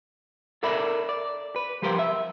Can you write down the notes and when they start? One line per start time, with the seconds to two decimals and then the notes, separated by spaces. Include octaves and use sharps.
0.63 A4 A#4 D5 E5 B5
1.09 D5
1.56 B4
1.82 F3 G3 G4 A#4 C5
1.99 E5